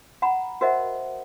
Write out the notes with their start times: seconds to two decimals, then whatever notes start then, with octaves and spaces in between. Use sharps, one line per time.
0.22 F#5 A#5 B5
0.61 F#4 A#4 C5 D#5 E5 F#5